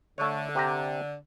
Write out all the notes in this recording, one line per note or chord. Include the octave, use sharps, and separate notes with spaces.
D3 A3 C#5
C3 G4 A#5